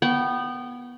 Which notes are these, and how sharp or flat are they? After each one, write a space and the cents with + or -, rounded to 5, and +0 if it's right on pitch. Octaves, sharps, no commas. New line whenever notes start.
B3 -10 G5 -25 C#6 +5